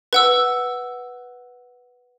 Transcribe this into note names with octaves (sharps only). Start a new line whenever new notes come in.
B4 F#5 E6